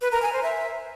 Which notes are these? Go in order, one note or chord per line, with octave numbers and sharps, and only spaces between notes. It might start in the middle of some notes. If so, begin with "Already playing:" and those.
B4
A#4
G#5
C5
E5